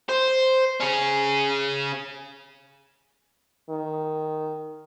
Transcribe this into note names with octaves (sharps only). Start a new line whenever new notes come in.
C5
C#4 G#4
D#3